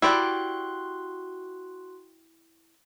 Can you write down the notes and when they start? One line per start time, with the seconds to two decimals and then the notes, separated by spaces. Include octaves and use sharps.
0.02 E4 F#4 G4 D5 C6 F#6